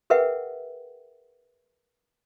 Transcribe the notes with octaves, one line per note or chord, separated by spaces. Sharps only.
G#4 A#4 B4 E5 F#5 G5